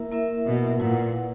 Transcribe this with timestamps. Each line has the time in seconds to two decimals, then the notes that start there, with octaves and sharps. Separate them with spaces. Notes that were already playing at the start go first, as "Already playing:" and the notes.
Already playing: A#3 E4 A#4 E5
0.12 A#3 E4 A#4 E5
0.46 B2
0.79 A#2 E4 B4 F#5